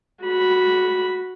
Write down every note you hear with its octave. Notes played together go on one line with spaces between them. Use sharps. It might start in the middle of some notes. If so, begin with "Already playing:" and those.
F#4 B5